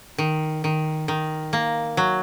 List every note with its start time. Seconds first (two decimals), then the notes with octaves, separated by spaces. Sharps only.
0.18 D#3
0.64 D#3
1.08 D#3
1.53 A#3
1.97 F#3